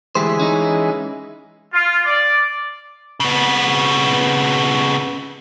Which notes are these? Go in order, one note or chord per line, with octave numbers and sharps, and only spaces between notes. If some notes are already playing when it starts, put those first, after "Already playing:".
D2 E3 G#3 G4 C5
C#4 D#4
F4
D5
C#3 B3